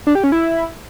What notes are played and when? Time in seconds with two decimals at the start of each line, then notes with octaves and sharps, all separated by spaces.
0.07 D4
0.15 G4
0.24 C#4
0.32 E4